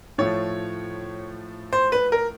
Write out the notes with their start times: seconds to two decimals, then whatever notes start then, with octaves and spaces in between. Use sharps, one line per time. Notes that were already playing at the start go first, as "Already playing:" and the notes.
0.18 A2 F3 A3 C#5
1.73 C5
1.92 B4
2.12 A#4